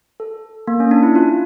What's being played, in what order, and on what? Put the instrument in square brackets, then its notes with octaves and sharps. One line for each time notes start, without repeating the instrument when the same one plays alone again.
[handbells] A4
A#3
C#4
D4
E4
F4